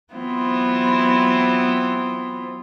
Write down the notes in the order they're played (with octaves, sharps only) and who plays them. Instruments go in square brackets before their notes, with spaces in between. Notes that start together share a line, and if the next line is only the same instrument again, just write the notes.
[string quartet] E3 F#3 B3 C4 E4 F4